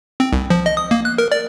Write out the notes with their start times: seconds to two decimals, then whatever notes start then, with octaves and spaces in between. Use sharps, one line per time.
0.20 C4
0.33 C2
0.50 F3
0.66 D#5
0.77 D#6
0.91 A#3
1.05 F#6
1.18 A#4
1.32 D5